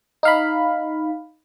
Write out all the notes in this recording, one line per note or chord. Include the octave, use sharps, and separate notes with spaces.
D#4 F5 B5